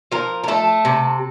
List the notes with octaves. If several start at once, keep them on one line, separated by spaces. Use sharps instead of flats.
F3 A#4
A#4
A3 A4
C3